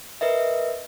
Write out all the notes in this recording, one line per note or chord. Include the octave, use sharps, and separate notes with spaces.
A#4 B4 D#5 E5